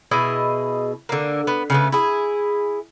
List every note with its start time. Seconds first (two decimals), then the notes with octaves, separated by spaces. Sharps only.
0.11 B2 E4 G#4 D#5
1.09 D3 A#3
1.47 B3
1.70 C#3 A3 B3
1.92 E4 G#4